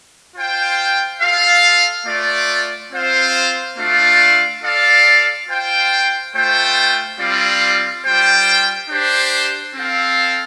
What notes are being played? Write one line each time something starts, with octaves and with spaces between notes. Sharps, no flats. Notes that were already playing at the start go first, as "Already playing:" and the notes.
F4 C5 G5
F4 A4 F5
A3 F4 D5
C4 F4 C5 F5
A3 D4 F4 D5 F5
F4 A4 D5 F5
F4 C5 G5
A3 F4 C5 G5
G3 C4 F4 D5 F5
G3 F4 C5 G5
D4 G4 C5
C4 A4 F5